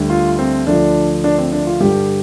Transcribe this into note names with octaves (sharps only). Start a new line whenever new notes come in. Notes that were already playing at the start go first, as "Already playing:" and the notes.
Already playing: D2 D3 G3
F4
C4
D2 D3 F3 D4
D4
C4
D4
F4
G2 D3 G3 G4